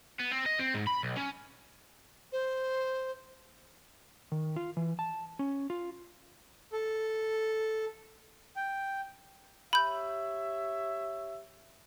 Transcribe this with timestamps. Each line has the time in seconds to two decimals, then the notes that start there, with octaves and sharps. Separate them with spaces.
0.20 B3
0.31 C4
0.46 D#5
0.59 C4
0.74 G#2
0.87 B5
1.03 B1
1.17 C#4
2.32 C5
4.32 D#3
4.56 F4
4.77 E3
4.99 A5
5.39 C#4
5.70 F4
6.73 A4
8.56 G5
9.73 G4 C#5 E5 B5 G6